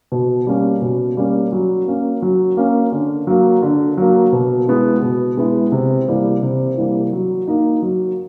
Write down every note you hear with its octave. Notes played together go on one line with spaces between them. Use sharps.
B2
G3 A#3 C#4
B2
G3 A#3 C#4
F#3
A#3 C#4
F#3
A#3 C#4
D3
F#3 A#3
D3
F#3 A#3
B2
G#3 B3 E4
B2
G#3 B3 E4
C3
E3 G3 A#3
C3
E3 G3 A#3
F#3
A#3 D#4
F#3